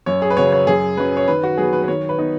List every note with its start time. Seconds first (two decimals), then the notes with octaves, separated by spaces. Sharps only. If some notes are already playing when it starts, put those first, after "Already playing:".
0.06 F#2 C#5
0.22 G#4
0.30 B4
0.37 C#3 F#3 C#5
0.52 C#5
0.67 F#2 G#4
0.97 F#3 C#4 B4
1.17 C#5
1.28 D#3 B4
1.43 F#4
1.57 F#3 B3 G#4
1.73 B4
1.83 B4
1.88 D#3 C#5
2.09 B4
2.18 B3 D#4